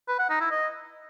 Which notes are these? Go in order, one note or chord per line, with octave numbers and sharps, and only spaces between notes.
B4
F#5
D#4
E4
D#5